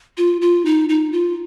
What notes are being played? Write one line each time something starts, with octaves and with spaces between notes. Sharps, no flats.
F4
F4
D#4
D#4
F4